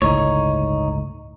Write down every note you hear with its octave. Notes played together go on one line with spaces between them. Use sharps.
G1 C#2 A2 D#4 C#5